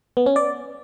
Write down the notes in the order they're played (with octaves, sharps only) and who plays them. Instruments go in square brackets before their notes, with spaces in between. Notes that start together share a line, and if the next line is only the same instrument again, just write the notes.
[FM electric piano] B3
C#4
D5